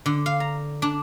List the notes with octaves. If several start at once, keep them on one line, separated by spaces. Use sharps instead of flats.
D3
F5
A#5
D4